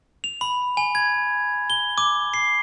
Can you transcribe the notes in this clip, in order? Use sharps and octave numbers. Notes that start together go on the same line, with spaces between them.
F7
B5
G#5
G#6
G7
D6
C7